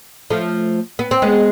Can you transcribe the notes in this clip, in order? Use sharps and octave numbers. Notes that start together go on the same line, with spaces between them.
F3 A3
B3
C4
G#3 B3